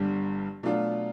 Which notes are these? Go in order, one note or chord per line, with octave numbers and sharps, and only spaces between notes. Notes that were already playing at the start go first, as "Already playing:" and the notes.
Already playing: G1 G2 D3 G3
B2 F#3 A3 D4 F4